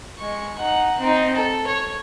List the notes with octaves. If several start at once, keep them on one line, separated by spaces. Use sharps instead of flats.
G#3 C#6
D#4 F#5
C4 D#4
A4
C#5